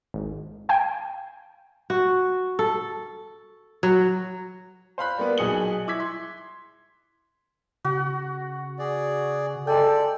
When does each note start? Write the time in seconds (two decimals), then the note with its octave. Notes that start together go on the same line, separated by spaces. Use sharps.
0.14 G#1
0.69 F5 G5 G#5
1.90 F#4
2.59 A4
3.83 F#3
4.98 C5 F5 B5 F#6
5.18 G3 A#3 B3
5.38 B1 D#4 G#4 D#6 C#7 F#7
5.87 E4 D6 E6 G#6 B6
6.00 C6
7.85 C#3 F#4
8.79 G#4 D5
9.67 G#3 A4 D5 G5